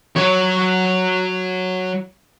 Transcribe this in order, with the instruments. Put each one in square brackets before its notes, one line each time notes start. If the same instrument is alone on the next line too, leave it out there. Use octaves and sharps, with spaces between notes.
[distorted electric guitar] F#3 C#5